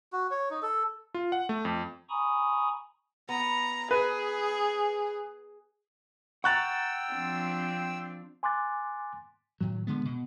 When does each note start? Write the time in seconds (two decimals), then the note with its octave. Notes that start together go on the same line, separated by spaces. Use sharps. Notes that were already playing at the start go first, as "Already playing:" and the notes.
0.13 F#4
0.31 C#5
0.51 D#4
0.62 A4
1.14 F4
1.32 F#5
1.49 A3
1.65 F2
2.10 G#5 A#5 B5 C#6 D#6
3.29 B3 A#5
3.91 G#4 B4
6.44 F#5 G5 A#5 C#6 E6 F#6 A6
7.12 F3 C4 D4
8.43 G#5 C6 D6 F#6 A6
9.61 A2 D#3 F#3
9.87 D3 G#3 B3
10.05 B2